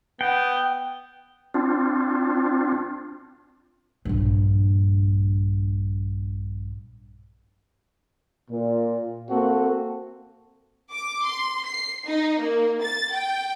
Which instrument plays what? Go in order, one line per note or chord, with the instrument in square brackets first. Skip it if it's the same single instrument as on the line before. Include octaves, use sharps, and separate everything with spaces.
[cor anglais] B3 [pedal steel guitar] G5
[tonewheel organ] C4 D4 F4
[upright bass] A#1 G2
[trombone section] A#2
A#3 C4 F#4 A4
[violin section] D6
C6
C7
D#4
A#3
A6
G5